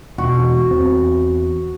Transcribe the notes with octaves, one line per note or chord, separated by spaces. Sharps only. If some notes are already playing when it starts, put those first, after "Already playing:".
E1 F#4
E2 E3 C4